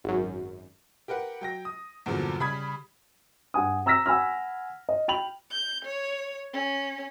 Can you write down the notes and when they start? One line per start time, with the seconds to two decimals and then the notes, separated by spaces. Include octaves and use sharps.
0.04 G#1 F#2
1.08 G4 A#4 B4 F#5
1.41 F#3 G5 A#6
1.65 D#6
2.06 E2 G2 A#2 D3 F3 F#3
2.40 C#3 G3 B5 D#6 G#6 B6
3.54 G2 F#5 G#5 D#6
3.86 A#5 E6 F6 A#6 B6
4.06 F#5 G#5 B5 E6 F6
4.89 D#5
5.08 G5 B5 F7 F#7
5.51 G6
5.85 C#5
6.53 C#4